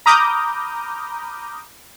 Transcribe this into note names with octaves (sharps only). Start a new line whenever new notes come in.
A#5 B5 D6 D#6 F6 G6